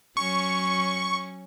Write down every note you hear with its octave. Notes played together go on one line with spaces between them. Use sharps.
F#3 C#4 C#6